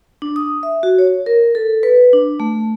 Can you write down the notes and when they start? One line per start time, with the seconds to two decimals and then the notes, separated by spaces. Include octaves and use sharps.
0.22 D4
0.36 D#6
0.63 E5
0.83 F#4
0.98 C#5
1.26 A#4
1.55 A4
1.83 B4
2.13 D4
2.40 A3